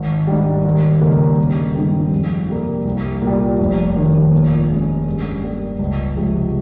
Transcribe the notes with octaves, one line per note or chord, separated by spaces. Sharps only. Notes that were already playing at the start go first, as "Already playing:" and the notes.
Already playing: G#1
G#2 G3
D#2
C#3 G3 A#3 D#4
G1
G2 D#3 G#3 C4
F2
C3 G3 A#3
C2
A#2 G3
F1
D#2 D#3
A#2
G#3 C#4
G2
G3 A#3
C#2
C3 F3 G#3